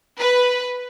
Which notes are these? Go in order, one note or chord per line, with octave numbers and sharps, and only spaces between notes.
B4